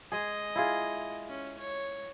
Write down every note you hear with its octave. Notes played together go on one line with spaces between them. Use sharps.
G#3 G#4 D#5
E4 F4 G#4
C#4
C#5